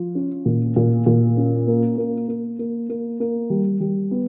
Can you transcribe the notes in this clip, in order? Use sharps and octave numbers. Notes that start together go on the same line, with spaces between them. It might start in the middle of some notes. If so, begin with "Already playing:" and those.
Already playing: F3 F4
C#4
A#2
A#2
A#2
C#4
A#3
A#3
A#3
A#3
A#3
A#3
G3
G3
B3